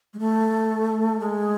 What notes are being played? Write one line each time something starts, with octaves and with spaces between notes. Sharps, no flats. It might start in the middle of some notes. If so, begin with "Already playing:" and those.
G#3
A3
G#3